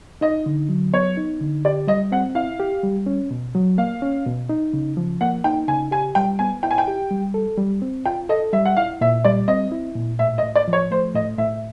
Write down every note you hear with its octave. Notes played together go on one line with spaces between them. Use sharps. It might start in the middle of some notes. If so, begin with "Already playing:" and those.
D#4 D#5
D3
F#3
B3 C#5
D#4
D3
G4 D5
G3 D#5
C4 F#5
E4 F5
G4
G3
C#4
B2
F#3
A#3 F5
C#4
B2
D#4
C#3
F3
A#3 F#5
D#4 G5
C#3 G#5
G4 G#5
G3 G5
B3 G#5
E4 G5
G#5
G5
G4
G3
A4
G3
C4
F4 G5
A4 D#5
G3 E5
F#5
E4 F5
A#2 E5
G3 D5
C4 D#5
E4
A#2
A2 E5
D#5
A2
D5
F3
C#5
A3 C5
A2 D#5
A2 E5